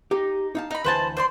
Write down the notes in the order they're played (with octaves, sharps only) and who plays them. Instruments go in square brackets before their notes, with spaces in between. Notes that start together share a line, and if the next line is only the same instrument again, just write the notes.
[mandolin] D#4 [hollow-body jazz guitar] G4
[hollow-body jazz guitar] D#4 F5 A5
[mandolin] D#4 B5 [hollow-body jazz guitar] D#5
[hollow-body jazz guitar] D2 E3 G#5 [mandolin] B4 C5 A5
[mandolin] C5 D5 C6